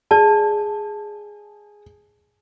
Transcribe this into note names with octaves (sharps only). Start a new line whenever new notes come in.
G#4 D5 A5